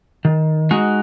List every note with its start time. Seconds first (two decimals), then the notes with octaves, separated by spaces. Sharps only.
0.25 D#3
0.71 G#3 D#4 F#4